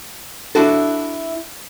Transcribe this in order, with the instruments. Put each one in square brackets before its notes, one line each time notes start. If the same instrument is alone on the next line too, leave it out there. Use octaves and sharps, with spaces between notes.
[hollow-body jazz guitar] D4 E4 F#4 A4